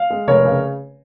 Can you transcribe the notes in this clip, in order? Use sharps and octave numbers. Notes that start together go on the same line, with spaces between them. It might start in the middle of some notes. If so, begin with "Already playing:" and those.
Already playing: F5
G#3
F1 A#4 C#5
C#3